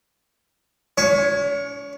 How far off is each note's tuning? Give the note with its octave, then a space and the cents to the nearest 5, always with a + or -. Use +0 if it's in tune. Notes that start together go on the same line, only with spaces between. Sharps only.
C#4 +45 C#5 +0